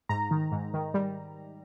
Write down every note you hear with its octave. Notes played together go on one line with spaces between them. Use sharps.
G#2 A#5
D#3
G#2
D#3
G3